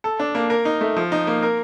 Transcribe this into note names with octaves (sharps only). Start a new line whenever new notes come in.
A4
D4
A#3
A#4
D#4
A3
F3
D#4
A#3
A#4